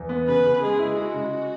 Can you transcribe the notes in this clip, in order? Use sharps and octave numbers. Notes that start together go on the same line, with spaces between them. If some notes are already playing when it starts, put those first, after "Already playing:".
Already playing: E2
B3
C#3 B4
C#3
G#3 G#4
E4
G#3 F#4
C#3